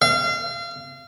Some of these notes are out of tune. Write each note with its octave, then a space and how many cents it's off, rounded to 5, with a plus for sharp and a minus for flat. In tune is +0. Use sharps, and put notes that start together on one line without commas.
F5 -30